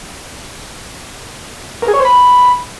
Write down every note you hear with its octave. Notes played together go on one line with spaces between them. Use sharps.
A#4
G#4
C#5
C5
B5